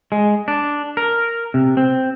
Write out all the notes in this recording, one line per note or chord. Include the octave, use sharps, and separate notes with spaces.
G#3
D4
A#4
C3
C4